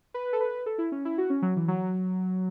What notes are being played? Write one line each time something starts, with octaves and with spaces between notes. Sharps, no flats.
B4
A4
B4
A4
E4
C#4
E4
F#4
C#4
F#3
E3
F#3